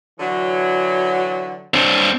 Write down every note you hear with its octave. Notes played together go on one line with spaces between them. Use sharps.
D3 E3 F#3
C4 D4